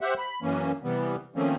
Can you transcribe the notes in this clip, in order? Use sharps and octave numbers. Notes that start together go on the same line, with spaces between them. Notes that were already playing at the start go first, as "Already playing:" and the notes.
G4 C5 E5 F#5
B5
F#2 E3 A#3 C#4
C3 E3 G3 B3
D#3 F3 A3 A#3 C4 C#4